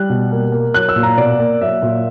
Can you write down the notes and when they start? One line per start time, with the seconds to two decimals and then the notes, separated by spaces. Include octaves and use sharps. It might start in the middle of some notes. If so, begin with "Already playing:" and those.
Already playing: G3 F#6
0.10 B2
0.32 A#3
0.52 A#3
0.74 F#3 F#6
0.89 E6
0.96 A#2
1.03 A#5
1.17 B2 D5
1.39 A#3
1.61 F#3 E5
1.82 A#2